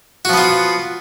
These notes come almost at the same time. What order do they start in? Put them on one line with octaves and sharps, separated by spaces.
F#4 F3 B3 F4